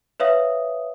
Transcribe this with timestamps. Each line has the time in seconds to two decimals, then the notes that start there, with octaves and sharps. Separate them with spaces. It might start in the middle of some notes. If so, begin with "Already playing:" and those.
0.20 B4 C#5 E5 F5 D#6